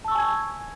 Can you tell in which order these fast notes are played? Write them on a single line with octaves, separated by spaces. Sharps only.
A5 E6 C#6 G#5 G#6